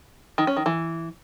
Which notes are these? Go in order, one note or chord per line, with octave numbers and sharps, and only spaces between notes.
D#3
C#4
D#3
E3